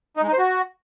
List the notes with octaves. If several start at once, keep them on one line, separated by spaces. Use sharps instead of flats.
D#4
G#3
D#4
C5
F#4